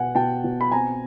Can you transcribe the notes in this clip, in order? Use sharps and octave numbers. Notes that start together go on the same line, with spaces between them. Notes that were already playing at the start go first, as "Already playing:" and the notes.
Already playing: B2 B3 F#5 G#5
B2 G5 A5
B2
B5
C4 G#5 A#5